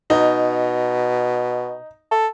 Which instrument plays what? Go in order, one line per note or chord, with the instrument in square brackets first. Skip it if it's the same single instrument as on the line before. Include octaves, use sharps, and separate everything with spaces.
[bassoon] B2 [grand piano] D#4
[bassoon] A4